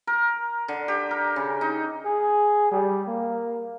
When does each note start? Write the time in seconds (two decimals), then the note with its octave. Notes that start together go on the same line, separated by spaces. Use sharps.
0.07 A#4
0.68 D3
0.88 G4
1.11 A#4
1.36 C#3
1.61 D#4
2.05 G#4
2.72 G3
3.07 A#3